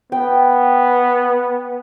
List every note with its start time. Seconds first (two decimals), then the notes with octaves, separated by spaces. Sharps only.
0.12 B3 G5